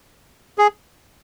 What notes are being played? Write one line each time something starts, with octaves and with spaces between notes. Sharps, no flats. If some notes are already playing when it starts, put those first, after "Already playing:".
G#4